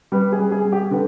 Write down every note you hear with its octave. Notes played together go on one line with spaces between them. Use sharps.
G3 B4
G#4
G3
G#4
G3
G4
D3 B4